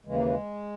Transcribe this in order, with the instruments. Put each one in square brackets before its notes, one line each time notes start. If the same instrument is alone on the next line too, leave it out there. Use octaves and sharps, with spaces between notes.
[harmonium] D#2 C#3 E3 G#3
A#3
G#3